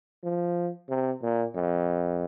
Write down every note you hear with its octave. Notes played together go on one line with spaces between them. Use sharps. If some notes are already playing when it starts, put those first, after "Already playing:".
F3
C3
A#2
F2